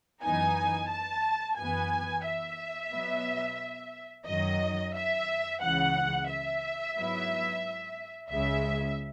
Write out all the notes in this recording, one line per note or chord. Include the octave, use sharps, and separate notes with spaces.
F#2 E3 B3 D#4 G#5
A5
F#2 E3 B3 G#5
E5
B2 F#3 B3
F#2 D#3 F#3 D#5
E5
C#2 C#3 E3 F#5
E5
G#2 F#3 B3 E4
C#2 C#3 G#3 E5